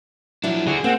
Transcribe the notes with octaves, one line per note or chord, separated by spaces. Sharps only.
F3 F#3 D4 E4
D3 F#4 G#4
A#3 C4 F#5